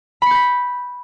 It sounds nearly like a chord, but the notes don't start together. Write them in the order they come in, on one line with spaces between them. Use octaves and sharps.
B5 C#7 G6 B6